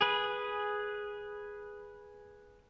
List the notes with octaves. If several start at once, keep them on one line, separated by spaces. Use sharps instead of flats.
G#4 B4